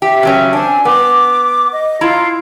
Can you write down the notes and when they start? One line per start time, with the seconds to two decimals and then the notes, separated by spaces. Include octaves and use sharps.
0.02 G4 E5
0.23 C#3 F#3 C#4
0.53 C4 D4 G#5
0.85 B3 D6
1.73 D#5
2.01 E4 F4 A#5